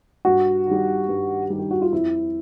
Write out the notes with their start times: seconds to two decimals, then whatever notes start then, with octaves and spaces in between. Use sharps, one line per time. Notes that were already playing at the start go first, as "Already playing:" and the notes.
0.25 G2 F#4
0.67 D#3 G3
1.09 G2
1.50 D#3 G3
1.59 G4
1.71 F#4
1.82 F4
1.93 F2 E4